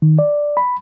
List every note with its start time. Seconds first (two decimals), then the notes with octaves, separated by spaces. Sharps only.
0.02 D#3
0.19 D5
0.57 B5